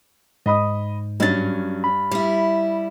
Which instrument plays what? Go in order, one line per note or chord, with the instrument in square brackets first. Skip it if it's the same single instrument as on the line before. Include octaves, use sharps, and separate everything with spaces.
[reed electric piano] G#2 [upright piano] D#5 B5 D#6
[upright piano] G2 A6 [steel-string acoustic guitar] F#3 C#4
[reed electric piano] B5
[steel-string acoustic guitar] G3 E4